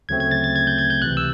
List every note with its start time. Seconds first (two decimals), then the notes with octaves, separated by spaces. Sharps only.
0.09 D2 C#3 F#3 A3 C4 G#6
0.20 G#6
0.31 A6
0.44 A6
0.56 G#6
0.67 G6
0.79 G#6
0.90 G6
1.02 C#2 C3 E3 F#6
1.17 E6